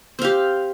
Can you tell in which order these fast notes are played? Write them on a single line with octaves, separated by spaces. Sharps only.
C4 F5 G4